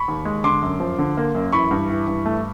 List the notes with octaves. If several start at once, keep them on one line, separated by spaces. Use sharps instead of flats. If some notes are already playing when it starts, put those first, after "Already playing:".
Already playing: B5 C#6
D#2
G#3
D3 C6 D6
F#2
F3
D3
A#3
F#2
E3 B5 C#6
G2
E3
G2
A3